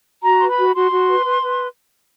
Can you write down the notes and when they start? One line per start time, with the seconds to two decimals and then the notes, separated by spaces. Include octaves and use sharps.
0.23 F#4 A#5
0.39 B4 C6
0.48 B5
0.58 F#4
0.74 F#4 C6
0.91 F#4
1.09 B4
1.26 B4
1.42 B4